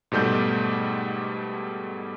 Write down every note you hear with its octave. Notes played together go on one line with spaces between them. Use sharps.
G#2 B2 G3 A3 G6